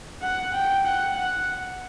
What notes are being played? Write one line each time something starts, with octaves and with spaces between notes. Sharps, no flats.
F#5
G5
F#5
F#5